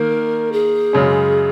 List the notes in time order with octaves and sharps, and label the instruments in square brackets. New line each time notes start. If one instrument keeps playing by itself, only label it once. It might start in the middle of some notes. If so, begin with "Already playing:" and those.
Already playing: [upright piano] D#3 A#3 [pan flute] A#4
[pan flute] G#4
[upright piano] F#2 C#3 G#3 C#4